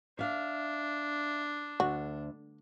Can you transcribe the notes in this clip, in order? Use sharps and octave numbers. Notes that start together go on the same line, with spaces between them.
D4 E5 F5
D2 F#4